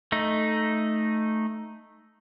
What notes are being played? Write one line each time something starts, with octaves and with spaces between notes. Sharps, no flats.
A3 D#4